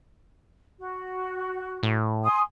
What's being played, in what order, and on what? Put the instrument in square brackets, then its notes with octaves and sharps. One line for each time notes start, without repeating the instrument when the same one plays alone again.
[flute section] F#4
[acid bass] A2
[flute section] G#5 C6 D#6